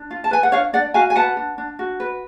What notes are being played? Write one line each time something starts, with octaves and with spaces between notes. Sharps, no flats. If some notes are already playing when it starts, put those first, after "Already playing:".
Already playing: D4
F4
A5
B4 G#5
F#5
D4 C#5 F5
D4 D5 F#5
F#4 F5 G#5
G#5
B4 F#5 A5
D4
D4
F#4
B4